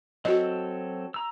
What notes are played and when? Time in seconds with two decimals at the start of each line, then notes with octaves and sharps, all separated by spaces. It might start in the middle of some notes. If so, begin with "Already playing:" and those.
0.25 F#3 C4 F#4 A4 D#5
1.14 A#5 E6